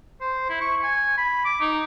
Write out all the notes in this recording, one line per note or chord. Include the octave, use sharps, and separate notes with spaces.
C5
E4
C#6
G#5
B5
D6
D#4